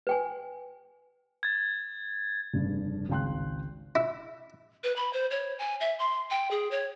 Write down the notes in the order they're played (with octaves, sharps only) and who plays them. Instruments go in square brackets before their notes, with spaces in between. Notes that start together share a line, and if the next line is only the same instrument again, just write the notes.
[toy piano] B4 G5 G#5
[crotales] G#6 A6
[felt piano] F1 G2 C#3
G#1 C#2 F5 G5 C6 F#6
[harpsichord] E4
[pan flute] B4
B5
C5
C#5
G#5
E5
C6
G5
G#4
C#5